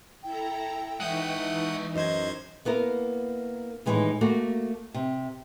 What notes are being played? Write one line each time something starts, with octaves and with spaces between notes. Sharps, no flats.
E4 A4 G5 A#5
E3 G#3 D#4 E5 F#5 D#6 G6
F#2 C5 D#5 G#6
A#3 B3 E4 A#4
A2 D#3 E3 G#3 B3
A3 A#3 F#4
C3